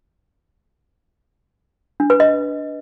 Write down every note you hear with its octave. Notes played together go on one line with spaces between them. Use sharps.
D4
B4
D#5